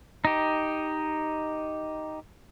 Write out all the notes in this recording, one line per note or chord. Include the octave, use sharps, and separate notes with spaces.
D#4 G4